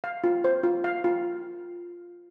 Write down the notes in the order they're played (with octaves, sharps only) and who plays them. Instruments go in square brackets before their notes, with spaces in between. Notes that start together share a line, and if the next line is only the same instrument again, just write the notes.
[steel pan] F5
F4
C5
F4
F5
F4